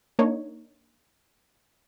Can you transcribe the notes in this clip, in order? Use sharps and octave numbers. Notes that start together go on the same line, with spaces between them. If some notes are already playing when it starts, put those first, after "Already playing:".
A#3 D4 D#4 C#5